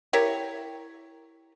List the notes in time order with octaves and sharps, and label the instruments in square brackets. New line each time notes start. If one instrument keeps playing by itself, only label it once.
[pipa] E4 G4 A#4 C#5